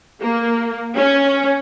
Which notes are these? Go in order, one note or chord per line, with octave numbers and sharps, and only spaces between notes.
A#3
C#4